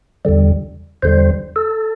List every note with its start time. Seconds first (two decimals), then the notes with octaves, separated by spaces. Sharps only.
0.25 E2 D3 G3
1.03 E2 D3 G3 C5
1.56 A4